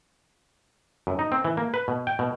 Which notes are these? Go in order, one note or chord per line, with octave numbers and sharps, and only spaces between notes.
F#2
D#4
C4
E3
A#3
B4
B2
G5
B2